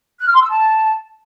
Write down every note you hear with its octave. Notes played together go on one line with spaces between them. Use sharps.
F#6
F6
C6
E6
A5